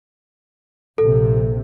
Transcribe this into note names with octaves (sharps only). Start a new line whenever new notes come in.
A#1 C3 A4